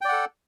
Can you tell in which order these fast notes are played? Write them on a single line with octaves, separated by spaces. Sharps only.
G5 D5 F#5 A4